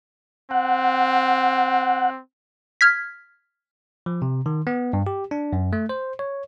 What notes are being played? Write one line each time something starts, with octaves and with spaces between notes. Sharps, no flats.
C4 F#5
F6 G#6 B6
F3
C3
D#3
B3
G2
G4
D4
F#2
A3
C5
C#5